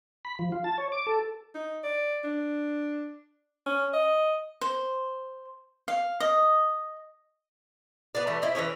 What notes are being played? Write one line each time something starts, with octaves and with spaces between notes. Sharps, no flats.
B5
F3
F4
A5
C#5
D6
A4
D#4
D5
D4
C#4
D#5
C5
F5
D#5
B3 G#4 D5
E3 G3 A3
E4 G4 C5 D#5
E3 G#3 C#4 C#5